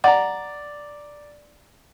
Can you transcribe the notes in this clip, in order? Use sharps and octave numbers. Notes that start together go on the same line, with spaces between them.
D5 F#5 A#5